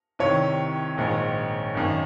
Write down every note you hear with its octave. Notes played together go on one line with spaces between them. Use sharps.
C2 C3 D#3 C#5
A#1 G#2 D#3
G#1 F#2 D#3